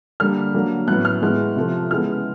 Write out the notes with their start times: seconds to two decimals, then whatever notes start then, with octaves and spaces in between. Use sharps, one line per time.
0.20 D3 G3 A#3 F6
0.54 D3 F#3 A#3
0.88 A2 F#3 B3 F#6
1.05 F6
1.22 A2 E3 G#3 B3 F#6
1.56 C3 F3 A3
1.91 C#3 E3 G#3 B3 F6